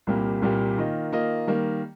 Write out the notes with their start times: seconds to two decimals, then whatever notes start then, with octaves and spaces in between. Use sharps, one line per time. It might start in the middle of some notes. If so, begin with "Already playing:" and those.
0.07 C2 A#2 G3 A#3 G4
0.42 C2 A#2 G3 A#3 G4
0.78 D#3 A#3 F4 D#5
1.13 D#3 A#3 F4 D#5
1.47 D#3 G3 A#3